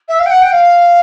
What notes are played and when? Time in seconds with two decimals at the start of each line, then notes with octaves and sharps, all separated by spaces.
0.08 E5
0.19 F5
0.25 G5
0.30 F#5
0.41 G5
0.52 F5